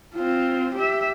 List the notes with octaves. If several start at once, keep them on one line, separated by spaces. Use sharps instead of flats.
C4 F4
G4 E5